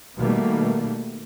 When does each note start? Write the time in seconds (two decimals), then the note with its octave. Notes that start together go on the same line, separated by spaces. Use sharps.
0.18 B2 D#3 G3 A3 A#3